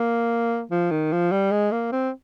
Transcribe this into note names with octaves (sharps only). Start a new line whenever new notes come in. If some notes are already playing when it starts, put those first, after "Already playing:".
Already playing: A#3
F3
D#3
F3
G3
G#3
A#3
C4